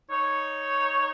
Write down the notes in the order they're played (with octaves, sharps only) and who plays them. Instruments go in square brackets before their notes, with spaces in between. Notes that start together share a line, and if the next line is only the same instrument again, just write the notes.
[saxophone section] D#4 C#5